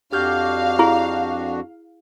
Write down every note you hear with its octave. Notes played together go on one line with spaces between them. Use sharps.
F2 D4 F#4 G4 F5 F6 G6
E4 G#4